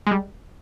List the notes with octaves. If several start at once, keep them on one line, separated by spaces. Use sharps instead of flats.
G#3
G3